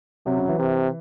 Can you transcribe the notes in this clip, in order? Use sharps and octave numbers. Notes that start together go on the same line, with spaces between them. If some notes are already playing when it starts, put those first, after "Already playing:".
C3 F#3
C#3
E3
C3